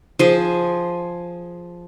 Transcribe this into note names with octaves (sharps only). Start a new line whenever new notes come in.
F3 G#4